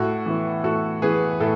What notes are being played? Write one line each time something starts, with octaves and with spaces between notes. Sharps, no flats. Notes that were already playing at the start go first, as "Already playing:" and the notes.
Already playing: A2 F#4 A4
E3 B3
A2 F#4 A4
E3 B3 G#4 B4
A2 A4